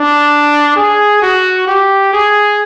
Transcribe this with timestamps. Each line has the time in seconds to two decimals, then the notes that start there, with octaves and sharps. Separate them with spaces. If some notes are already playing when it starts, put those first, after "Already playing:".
Already playing: D4
0.76 G#4
1.22 F#4
1.67 G4
2.13 G#4